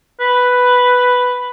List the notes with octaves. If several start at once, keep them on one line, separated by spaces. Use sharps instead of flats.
B4